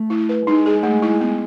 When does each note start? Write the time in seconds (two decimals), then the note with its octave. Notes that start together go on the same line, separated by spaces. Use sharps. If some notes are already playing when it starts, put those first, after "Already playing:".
Already playing: A3
0.10 E4
0.29 B4
0.47 G#3 D#4
0.66 G#4
0.83 A3
1.02 E4
1.21 B3